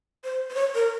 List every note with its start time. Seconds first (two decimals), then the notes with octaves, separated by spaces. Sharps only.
0.24 C5
0.50 C5
0.55 C#5
0.75 A#4